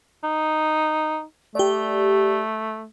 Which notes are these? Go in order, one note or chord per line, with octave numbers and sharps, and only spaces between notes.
D#4
A3 G4 D5